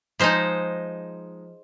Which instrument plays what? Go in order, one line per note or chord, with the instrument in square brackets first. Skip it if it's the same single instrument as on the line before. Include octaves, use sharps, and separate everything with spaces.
[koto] F3 G#3 D#4 C5